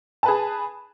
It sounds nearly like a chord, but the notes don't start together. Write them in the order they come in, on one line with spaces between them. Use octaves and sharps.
A5 B4 G#4